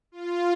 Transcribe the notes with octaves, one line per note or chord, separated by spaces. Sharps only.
F4